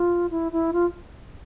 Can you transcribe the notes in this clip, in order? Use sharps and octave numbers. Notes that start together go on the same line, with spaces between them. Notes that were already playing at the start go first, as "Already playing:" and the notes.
Already playing: F4
E4
E4
F4